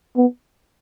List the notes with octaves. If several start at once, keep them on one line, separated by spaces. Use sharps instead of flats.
B3